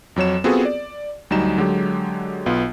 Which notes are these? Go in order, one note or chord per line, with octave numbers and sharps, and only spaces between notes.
F2 F#3 C#5 E7
B3 C4 F4 F#4 G#4 A4
D5
D2 F#3 G3 D#4 E7
D3 F#3 G#3 G4
B1 B3 F4